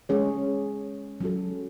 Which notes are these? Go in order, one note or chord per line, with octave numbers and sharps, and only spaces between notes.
G#3 C#4 G#4 C#5
F#3 C#4 F#4 A4